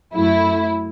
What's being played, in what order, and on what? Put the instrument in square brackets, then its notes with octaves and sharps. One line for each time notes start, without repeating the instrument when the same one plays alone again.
[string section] F#2 F#3 A3 E4